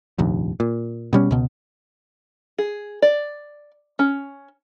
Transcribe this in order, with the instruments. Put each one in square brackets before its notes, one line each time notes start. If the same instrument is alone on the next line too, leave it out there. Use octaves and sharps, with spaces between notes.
[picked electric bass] F1 A#1 D#2
A#2
B2 G3 C#4
C#2 B2
[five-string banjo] G#4
D5
C#4